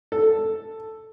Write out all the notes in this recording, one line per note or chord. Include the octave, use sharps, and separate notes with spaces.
A4